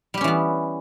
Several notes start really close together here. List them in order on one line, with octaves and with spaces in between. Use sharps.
G3 G4 C#4 E3 B3